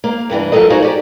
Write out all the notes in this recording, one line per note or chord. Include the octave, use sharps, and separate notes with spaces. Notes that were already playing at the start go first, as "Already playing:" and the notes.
A#3 F5
G2 C3 E3 D4
F3 F#3 A#3 A4 A#4 D#5
D#4 F#4 G#4 A#4 C5 F5
G4 D5